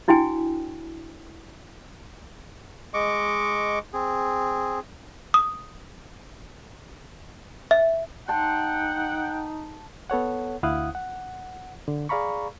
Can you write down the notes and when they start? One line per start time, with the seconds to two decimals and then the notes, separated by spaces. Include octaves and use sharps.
0.08 D4 E4 F#4 G5 G#5
2.94 G#3 D#5 C#6 D6
3.93 C4 G#4
5.34 D#6
7.71 E5
8.28 D#4 F#5 G5 A5 C6
10.10 B3 A4 C#5 F#5
10.63 D2 E4 F5 F#5 D#6 F#6
10.95 F#5
11.88 D3
12.09 G#4 D5 F5 A#5 B5 C#6